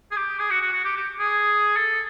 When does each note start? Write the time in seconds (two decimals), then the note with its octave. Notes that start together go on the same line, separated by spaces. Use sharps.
0.11 G#4
0.16 G4
0.39 G#4
0.50 F#4
0.62 F#4
0.73 F#4
0.84 G4
0.96 G4
1.19 G#4
1.76 A4